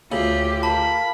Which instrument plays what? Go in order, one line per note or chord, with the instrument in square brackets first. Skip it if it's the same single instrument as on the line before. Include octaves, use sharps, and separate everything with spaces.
[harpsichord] D2 C#3 [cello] F4 G4
[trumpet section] A#4 F5 B5 [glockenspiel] A5